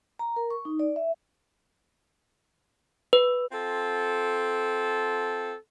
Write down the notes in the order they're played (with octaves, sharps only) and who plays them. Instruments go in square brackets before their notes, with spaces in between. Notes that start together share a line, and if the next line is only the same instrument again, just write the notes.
[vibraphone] A#5
A#4
C#6
D#4
D5
E5
[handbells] B4
[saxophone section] C4 F4 A4